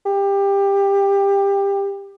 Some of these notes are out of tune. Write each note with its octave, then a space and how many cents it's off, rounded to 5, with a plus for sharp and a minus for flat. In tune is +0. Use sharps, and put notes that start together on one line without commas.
G4 +20